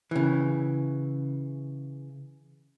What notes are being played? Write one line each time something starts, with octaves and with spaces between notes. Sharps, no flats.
C#3 E3